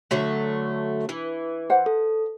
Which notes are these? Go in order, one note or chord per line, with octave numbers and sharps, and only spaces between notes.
D3 F#3 A3
E3
C5 F#5
A4